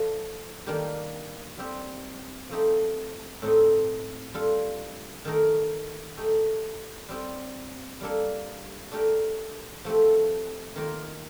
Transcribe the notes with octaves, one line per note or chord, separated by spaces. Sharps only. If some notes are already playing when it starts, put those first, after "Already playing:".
Already playing: F3 A3 D4 A4
D#3 G3 A#3 D4 G4
G3 C4 G4
F3 A3 C4 D#4 G4
A2 A3 C4 D#4
G3 D4 F4 A4
D#3 A3 D#4 A#4
A3 D#4 G4
G3 C4 G4
G3 A#3 D4 A4
A3 D4 G4 A#4
F3 A3 C4 G4
D#3 A#3 F4 A#4